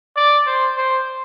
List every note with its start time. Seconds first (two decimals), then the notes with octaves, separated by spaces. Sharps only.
0.16 D5
0.47 C5
0.77 C5